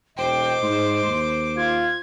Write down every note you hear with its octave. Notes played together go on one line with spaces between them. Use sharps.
E1 C5 D#5 G5 D6
G#2 C6
D#2
F4 G#6